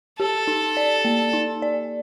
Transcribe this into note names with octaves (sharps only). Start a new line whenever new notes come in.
G4 A4
D#4
D5
A#3
D#4
D5